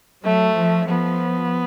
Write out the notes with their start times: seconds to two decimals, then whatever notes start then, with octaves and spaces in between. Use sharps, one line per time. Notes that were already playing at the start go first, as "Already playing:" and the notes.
0.24 F#3 A3
0.57 F3
0.89 F3 B3